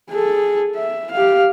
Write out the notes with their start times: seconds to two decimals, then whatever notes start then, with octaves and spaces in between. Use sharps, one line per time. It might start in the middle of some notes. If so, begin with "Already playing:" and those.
0.11 G#4 A4
0.76 E5
1.11 G4 F5